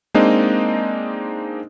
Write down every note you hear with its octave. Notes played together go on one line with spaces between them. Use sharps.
G#3 A#3 C4 D4 D#4 D#5